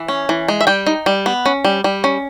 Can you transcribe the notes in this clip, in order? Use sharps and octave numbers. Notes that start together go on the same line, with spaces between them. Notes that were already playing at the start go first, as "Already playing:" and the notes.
Already playing: E3
C#4
E3
G#3
E5
G3 G5
D#4
G3
B3
C#4
G3
G3
C#4